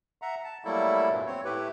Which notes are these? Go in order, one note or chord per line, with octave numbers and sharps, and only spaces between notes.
E5 F#5 A#5
A5
F#3 G3 A3 A#3 E4 A4
E2 G2 A#2 E3 F#3
C4 C#5
A2 A3 E4 G4 B4